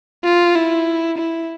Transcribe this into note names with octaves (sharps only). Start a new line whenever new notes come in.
F4
E4
E4